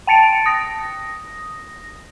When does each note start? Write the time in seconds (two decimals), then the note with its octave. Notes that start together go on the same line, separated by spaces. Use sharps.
0.07 G5 A5 A6 C#7 D7
0.46 D#6 A#6